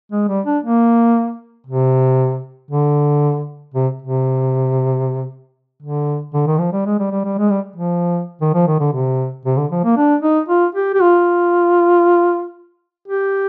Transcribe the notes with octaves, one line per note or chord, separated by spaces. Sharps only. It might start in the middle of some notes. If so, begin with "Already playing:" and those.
G#3
G3
D4
A#3
C3
D3
C3
C3
D3
D3
D#3
F3
G3
G#3
G3
G3
G3
G#3
G3
F3
D#3
F3
D#3
D3
C3
C3
D3
F3
A#3
D4
D#4
F4
G4
G4
F4
G4